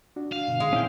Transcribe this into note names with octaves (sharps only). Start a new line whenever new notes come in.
D4 F#4
F5
G2 B2 D3
A#2 D#3 G#3
C#4 E4 G5